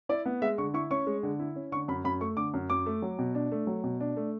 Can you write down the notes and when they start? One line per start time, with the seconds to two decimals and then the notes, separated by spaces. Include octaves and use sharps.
0.09 E4 D5
0.26 B3
0.42 G#3 E5
0.58 D3 C#6
0.74 E4 C#6
0.91 C#4 C#6
1.07 G#3
1.23 D3
1.39 E4
1.56 C#4
1.72 D3 C#6
1.88 F#2 B5
2.04 F#2 B5
2.21 A3 C#6
2.37 D3 D6
2.54 F#2
2.70 F#2 D6
2.86 A3
3.02 F#3
3.19 B2
3.35 D4
3.52 A3
3.67 F#3
3.84 B2
4.01 D4
4.17 A3